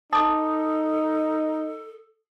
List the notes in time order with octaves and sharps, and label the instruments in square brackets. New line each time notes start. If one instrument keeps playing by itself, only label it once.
[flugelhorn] D#4 [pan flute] A4 [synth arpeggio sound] A5 D6 [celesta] D#6